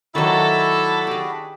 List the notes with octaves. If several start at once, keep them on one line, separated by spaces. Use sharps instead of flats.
D#3 F#3 D4 E4 F#4 A4 B5
G4 G#4